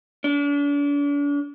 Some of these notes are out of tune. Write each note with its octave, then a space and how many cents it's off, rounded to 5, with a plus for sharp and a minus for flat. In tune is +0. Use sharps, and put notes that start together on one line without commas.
D4 -40